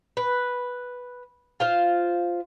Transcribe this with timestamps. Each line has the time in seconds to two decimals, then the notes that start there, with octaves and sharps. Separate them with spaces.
0.17 B4
1.60 F4 C5 F5